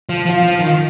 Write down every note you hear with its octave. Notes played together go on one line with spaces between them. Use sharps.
F3
F3 F4
F3
D#3